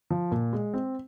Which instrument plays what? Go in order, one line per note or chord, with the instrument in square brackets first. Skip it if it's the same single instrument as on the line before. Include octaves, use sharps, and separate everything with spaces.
[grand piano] F3
A#2
G#3
C4